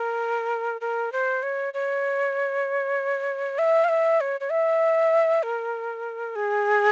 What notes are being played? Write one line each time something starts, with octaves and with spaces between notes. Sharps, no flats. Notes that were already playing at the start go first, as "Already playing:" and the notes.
Already playing: A#4
A#4
C5
C#5
C#5
E5
F5
E5
C#5
C#5
E5
A#4
G#4